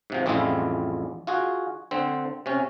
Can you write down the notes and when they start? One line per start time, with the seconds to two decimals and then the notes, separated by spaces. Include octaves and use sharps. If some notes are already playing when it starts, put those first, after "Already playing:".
0.10 G#2 C3 F3
0.26 A1 F2 G3 G#3 E4 F4
1.27 F4 F#4 G#4
1.91 D3 C4
2.46 C3 C#4